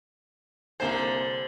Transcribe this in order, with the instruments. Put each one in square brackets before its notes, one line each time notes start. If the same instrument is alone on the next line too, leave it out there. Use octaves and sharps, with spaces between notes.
[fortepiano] C2 A#3 G#5 [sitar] D3 G3 C5